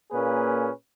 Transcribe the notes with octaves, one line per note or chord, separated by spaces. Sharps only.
A#2 A#3 C#4 G#4 B4